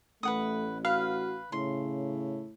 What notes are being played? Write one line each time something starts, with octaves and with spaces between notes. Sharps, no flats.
A1 A3 B4 F#5 D#6
F#4 B4 F5
A2 C#3 C6